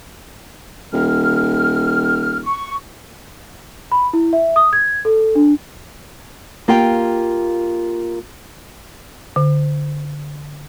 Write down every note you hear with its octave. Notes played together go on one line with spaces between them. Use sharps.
D#1 F6
C#6
B5
E4
E5
D#6
G#6
A4
D4
A#3 F4 G4 G5
D3